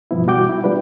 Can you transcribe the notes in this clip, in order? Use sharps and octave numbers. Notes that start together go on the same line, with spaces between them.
G2 B2 E3 F3 B3 E4
B2 G3 F#4 G5 D6 G6
E4 F#4
G3 D4 F4 B4